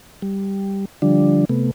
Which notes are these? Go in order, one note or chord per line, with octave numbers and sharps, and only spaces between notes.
G3
D3 F3 G3 D4
C3 A3 B3